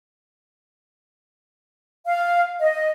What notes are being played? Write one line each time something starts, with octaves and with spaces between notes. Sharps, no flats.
F5
D#5